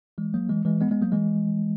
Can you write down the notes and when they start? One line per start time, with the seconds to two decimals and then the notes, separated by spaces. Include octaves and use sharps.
0.18 E3 G#3
0.34 F#3 A#3
0.49 E3 G#3
0.65 E3 G#3
0.81 G#3 B3
0.91 G#3 B3
1.02 F#3 A#3
1.12 E3 G#3